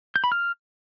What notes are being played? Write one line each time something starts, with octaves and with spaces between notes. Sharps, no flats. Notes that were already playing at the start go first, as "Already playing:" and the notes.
G6
B5
F6